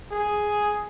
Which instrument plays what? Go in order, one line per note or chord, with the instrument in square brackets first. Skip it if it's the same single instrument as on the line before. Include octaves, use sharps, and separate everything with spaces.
[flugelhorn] G#4